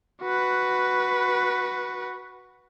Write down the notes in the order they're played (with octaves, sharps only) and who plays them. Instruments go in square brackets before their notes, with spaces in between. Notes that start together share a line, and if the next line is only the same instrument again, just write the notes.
[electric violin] F#4 B4